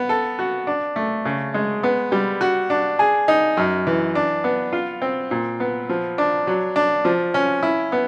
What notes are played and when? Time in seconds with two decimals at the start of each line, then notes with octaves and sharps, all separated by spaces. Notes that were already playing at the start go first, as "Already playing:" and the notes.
Already playing: B3
0.09 A4
0.39 F#4
0.67 D4
0.96 A3
1.25 C#3
1.54 G#3
1.83 B3
2.12 G3
2.41 F#4
2.70 D4
2.99 G#4
3.28 D#4
3.57 F#2
3.87 E3
4.15 D4
4.44 B3
4.73 F4
5.02 C4
5.31 A#2
5.60 B3
5.89 F3
6.18 D4
6.47 F#3
6.76 D4
7.05 F3
7.34 C#4
7.63 E4
7.92 B3